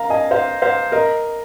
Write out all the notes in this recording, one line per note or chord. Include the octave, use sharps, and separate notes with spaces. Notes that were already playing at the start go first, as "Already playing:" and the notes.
Already playing: A#4 F5 A#5
D#5 G#5
C5 F5
C5 F5
A#4 D#5